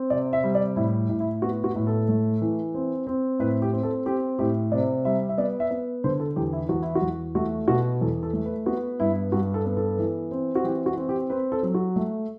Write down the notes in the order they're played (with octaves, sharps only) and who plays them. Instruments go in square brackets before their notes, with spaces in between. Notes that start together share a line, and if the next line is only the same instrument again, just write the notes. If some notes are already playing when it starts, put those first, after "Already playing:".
Already playing: [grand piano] C4
C3 D5
E5
G3
D5
A2 E4
A2
E4
B3 F#4
F#4
A2
A4
A3
E3
C4
C4
A2 B4
G4
C4
A4
C4 G4
A2 G4
C3 D5
G3 E5
E5
B3 D5
E5
B3
D3 C5
A4
E2 G4
E4
E2 F#4
E4
F#4
E2
A3 F#4
B2 F#4
E2 A4
A4
A3
B4
B3 F#4
G2 E4
G2 F#4
A4
B3
A4
E3
C4
F#4
E3 G4
F#4
C4
G4
C4 B4
A4
F#3
F#4
A3